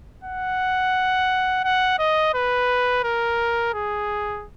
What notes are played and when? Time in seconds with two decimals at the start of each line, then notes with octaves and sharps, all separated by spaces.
0.24 F#5
1.64 F#5
1.99 D#5
2.34 B4
3.04 A#4
3.74 G#4